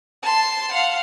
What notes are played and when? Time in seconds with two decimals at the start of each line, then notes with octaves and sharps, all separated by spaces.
0.23 A5 C6
0.71 F5 F#5